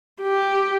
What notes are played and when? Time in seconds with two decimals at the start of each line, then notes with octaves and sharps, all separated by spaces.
0.22 G4